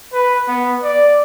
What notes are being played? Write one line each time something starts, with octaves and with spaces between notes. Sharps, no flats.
B4
B3
D5